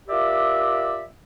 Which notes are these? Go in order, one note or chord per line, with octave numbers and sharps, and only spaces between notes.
F4 G4 A#4 D5 E5